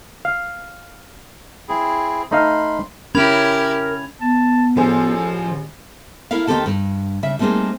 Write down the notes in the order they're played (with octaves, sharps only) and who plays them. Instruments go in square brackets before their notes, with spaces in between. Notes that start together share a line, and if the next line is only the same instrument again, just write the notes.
[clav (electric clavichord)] F5
[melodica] C4 E4 G#4
[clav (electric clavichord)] A3 D#4 F5 [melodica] B5 C6
[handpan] C#4 [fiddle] E4 G4 [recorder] A#4 [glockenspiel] B5 G#6 F7
[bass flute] B3 [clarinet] A5
[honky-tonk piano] A1 G#4 C5 [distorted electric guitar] F3 [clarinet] A4
[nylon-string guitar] E4 A4 A#4 E5 F5
D#2 D#3 C4 G4 A4 A5
G2
C#3 E5
G3 A3 A#3 C4 D#4 G#4